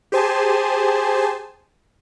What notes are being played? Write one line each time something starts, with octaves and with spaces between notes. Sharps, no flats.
G4 G#4 C5 G#5 A5